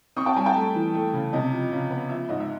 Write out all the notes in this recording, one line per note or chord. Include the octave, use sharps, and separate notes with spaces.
C4 C#6 D#6
G5 A5
G3 G#5 A#5
G5 A5
A3
E3
A3
C#3
C3 D#5
F3
C#3
B3
F3 E5
G#2 D#5
E5